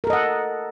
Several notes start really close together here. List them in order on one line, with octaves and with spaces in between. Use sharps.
A#4 A4 D#5 F#5